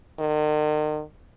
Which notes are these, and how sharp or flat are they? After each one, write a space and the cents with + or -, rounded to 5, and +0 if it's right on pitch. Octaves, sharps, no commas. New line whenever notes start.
D#3 -40